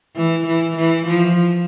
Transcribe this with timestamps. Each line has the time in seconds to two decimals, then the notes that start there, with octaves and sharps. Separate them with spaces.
0.16 E3
0.47 E3
0.77 E3
1.07 F3